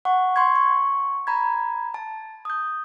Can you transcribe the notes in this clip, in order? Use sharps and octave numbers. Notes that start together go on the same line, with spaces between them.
F#5 C#6
C6 C#6 G#6
C#6
A#5 B5 G#6
A5
D#6 G6